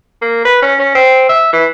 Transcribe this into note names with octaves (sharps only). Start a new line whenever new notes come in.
A#3
B4
C#4
C#4
C4
E5
E3